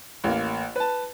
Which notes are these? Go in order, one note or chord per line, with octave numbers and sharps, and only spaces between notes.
A1 A#3
B4 A5